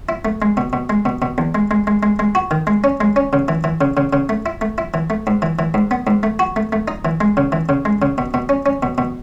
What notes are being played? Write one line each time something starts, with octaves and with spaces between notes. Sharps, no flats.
E4
A3
G#3
B2
B2
G#3
B2
B2
E2
G#3
G#3
G#3
G#3
G#3
F#4
D#3
G#3
C#4
G#3
C#4
C#3
E3
E3
C#3
C#3
C#3
A3
E4
A3
E4
E3
A3
G#2
E3
E3
G#2
B3
G#2
A3
F#4
A3
A3
D#4
E3
G#3
C#3
E3
C#3
G#3
C#3
B2
B2
C#4
C#4
B2
B2